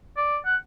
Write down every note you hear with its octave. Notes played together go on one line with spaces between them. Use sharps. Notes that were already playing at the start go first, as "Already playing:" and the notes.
D5
F#5